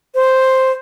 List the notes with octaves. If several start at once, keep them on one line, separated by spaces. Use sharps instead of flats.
C5